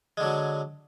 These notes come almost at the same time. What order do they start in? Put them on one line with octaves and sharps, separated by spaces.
G#3 D3 F#3